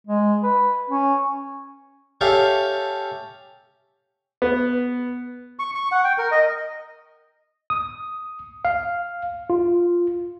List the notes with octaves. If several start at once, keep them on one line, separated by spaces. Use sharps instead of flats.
G#3
B4
C#4
C#4 G4 A4 E5 F5
B3
C#6
C#6
F#5
G5
A#4
D#5
D#6
F5
F4